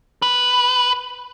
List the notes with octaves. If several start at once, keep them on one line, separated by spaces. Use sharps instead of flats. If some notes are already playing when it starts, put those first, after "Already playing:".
B4